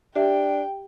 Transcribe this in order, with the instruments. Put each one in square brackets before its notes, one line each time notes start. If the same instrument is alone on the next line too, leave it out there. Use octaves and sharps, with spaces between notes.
[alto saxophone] D4 [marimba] G4 E5 [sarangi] G5